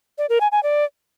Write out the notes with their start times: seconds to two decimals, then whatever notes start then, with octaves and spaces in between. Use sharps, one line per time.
0.18 D5
0.29 A#4
0.41 G#5
0.52 G#5
0.63 D5